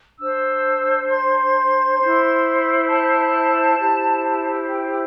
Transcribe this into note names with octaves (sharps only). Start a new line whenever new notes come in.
D4 C5 E6
C6
E4 C5
A5
E4 G4 C5
G5